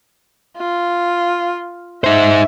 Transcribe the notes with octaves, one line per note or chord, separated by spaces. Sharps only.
F4
D#4 C5 E5